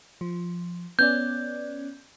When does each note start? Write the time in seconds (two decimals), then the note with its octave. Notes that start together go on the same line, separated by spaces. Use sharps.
0.21 F3
0.99 B3 C#4 D5 G6